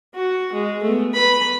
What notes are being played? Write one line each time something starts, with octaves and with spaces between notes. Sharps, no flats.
F#4
G#3
A3 B3
B4 B5